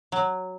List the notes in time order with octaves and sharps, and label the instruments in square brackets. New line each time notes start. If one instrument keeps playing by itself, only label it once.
[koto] F#3